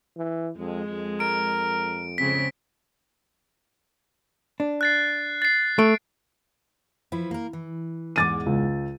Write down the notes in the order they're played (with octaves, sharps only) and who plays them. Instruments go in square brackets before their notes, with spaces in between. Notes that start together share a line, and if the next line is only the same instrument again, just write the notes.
[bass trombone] E3
[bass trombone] F2 [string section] G#3
[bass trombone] F2
[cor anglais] A#4 [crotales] D7
[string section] C#3 G#3 C4 [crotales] B6
[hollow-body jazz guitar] D4
[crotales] F#6 A6 C7
A6 C7
[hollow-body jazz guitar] A3 [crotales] D7
[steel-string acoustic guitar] F3 E4 B4
A#3 A#4
E3
[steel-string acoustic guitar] E2 G#2 G#3 [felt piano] D6 A6 D#7
[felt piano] C#2